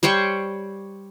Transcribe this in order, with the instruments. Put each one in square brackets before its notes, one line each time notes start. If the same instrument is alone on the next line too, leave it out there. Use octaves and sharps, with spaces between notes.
[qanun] G3 C5 C#5 G5